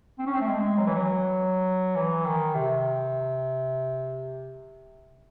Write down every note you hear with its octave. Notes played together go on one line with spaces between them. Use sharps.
C4
C#4
C4
A3
G#3
F#3
E3
F#3
E3
D#3
C3